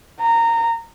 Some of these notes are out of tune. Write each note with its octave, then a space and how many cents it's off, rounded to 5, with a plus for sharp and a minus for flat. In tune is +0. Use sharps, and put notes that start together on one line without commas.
A#5 -20